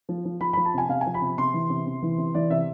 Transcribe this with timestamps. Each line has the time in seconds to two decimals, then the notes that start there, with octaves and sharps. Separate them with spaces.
0.09 F3
0.25 F3
0.41 F3 B5
0.53 F3 B5
0.65 A5
0.74 C3 G#5
0.89 C3 F5
1.01 G#5
1.06 F3
1.14 B5
1.22 C3
1.37 C3 C6
1.54 E3
1.70 C3
1.87 C3
2.02 E3
2.18 C3
2.34 E3 D5
2.50 C3 E5